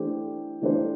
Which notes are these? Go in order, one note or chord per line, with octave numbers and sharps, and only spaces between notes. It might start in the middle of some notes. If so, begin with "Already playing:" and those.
Already playing: E3 A3 D4 G4 C5
E3 A3 D4 G4 C5